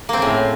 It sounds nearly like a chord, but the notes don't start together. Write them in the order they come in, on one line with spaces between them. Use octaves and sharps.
A#3 C4 C#3 A2